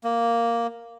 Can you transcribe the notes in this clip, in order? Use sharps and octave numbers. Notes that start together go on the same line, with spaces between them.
A#3